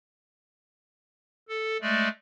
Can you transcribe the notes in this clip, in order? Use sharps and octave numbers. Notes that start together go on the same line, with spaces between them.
A4
G#3 A3 D5